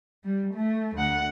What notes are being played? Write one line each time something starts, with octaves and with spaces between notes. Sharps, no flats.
G3
A3
D2 F#5